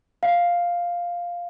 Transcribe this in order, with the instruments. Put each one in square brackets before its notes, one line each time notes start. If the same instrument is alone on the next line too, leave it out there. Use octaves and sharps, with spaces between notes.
[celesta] F5